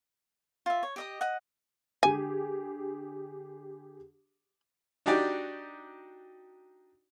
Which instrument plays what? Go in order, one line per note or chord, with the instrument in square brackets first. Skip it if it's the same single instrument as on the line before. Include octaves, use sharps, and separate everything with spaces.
[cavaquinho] F4 E5
C#5
G4 D#5 D#6
D#5 F#5
[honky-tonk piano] D3 G4 G#4 [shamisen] G#5
[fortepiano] D4 D#4 F#4 G4 D5